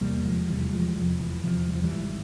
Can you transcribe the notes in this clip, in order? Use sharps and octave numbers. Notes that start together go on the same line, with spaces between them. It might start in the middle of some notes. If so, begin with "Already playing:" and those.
F1 E2 C3 G3 A#3
F3 G#3
F1 E2 C3 E3 G3
F3 G#3
F1 E2 C3 F3
E3
F1 E2 C3 F3
G3
F3
E3 G3
G#1 G#2